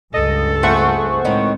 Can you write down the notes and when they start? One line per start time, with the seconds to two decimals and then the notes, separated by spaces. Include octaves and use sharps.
0.14 C#2 G2 A4 D#5
0.63 F2 A3 G#4 C5 F#5 C#6
1.25 A2 D#3 G#3 C4 D#4